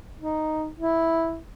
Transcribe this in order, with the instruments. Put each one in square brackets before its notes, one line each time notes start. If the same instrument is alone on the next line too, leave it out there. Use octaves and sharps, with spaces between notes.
[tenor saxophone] D#4
E4